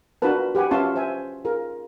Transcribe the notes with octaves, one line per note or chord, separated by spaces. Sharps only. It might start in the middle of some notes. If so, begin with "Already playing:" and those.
D4 F4 F#4 A#4 B4 A5
G4 B4 F#5 G#5
C#4 F4 E5 A5 C6 C#6
C5 E5 G#5
F4 G#4 A#4